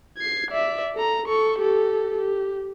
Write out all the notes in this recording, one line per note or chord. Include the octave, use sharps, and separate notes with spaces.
G#6 C7
D5 E5
A4 A#5
A4 C#6
G4 A4
G4